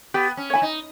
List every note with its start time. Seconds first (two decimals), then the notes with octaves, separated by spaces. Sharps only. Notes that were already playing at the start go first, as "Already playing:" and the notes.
0.14 B3 G4
0.37 C#4
0.50 E4 C#5 G#5
0.62 D#4